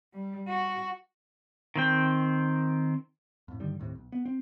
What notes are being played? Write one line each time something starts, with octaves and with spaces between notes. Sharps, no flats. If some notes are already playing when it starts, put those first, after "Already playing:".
G3
F#4
D#3 C4 G5
F2 A2
G2 D3 D#3 G3
D#2 A2 C3
B1
B3
C4